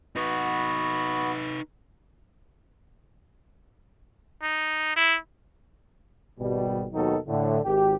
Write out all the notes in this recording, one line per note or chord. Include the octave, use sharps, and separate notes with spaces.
B3 D#4 F#4 B4 B5
D#4
E4
G#1 B2 G3
D#2 B2 D#3 F#3 D#4 A4
A2 D3
G#1 G4